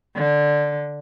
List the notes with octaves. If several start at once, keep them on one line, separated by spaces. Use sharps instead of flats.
D3